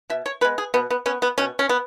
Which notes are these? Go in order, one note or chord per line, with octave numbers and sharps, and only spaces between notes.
B2 E5
C#5
G#3 B3 B4
G#4
B2 B3
B3
B3 C#4
B3
B2 C#4
C#4
B3